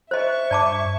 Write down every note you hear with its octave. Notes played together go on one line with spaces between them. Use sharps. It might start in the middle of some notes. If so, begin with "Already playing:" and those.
C5 D#5 E5 C#6
G2 D5 A5 D6